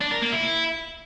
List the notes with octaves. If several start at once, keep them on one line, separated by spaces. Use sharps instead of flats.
D4
A#4
A#3
E4